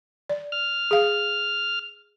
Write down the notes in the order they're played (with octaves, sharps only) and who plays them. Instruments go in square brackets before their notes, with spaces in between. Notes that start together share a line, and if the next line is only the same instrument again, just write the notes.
[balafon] D5
[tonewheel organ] F6
[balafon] G#4 F5